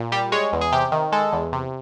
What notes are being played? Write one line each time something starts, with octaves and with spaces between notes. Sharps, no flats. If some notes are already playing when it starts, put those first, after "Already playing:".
Already playing: A#2
G3 G4
G#3 C#5
E2
G#4
C3 G4
D#3
G#3 A4
E2
C3